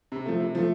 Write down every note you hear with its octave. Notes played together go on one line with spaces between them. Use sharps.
C3
F3 A3
C3
F3 A3